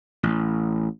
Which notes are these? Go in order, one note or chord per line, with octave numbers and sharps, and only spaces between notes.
A1